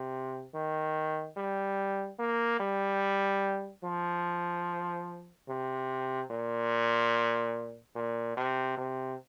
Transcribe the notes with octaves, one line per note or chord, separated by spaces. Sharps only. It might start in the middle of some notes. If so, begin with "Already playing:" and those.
Already playing: C3
D#3
G3
A#3
G3
F3
C3
A#2
A#2
C3
C3